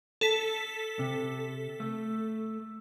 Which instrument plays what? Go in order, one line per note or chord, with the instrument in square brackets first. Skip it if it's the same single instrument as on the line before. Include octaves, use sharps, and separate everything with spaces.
[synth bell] A4 B6
[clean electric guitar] C3
A3